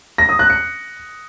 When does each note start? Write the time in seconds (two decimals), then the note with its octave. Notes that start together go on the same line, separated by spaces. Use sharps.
0.18 A#6
0.29 D#6
0.39 F#6
0.50 C#7